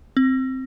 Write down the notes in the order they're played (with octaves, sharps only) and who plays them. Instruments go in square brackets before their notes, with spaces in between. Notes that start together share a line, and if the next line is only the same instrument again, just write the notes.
[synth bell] C4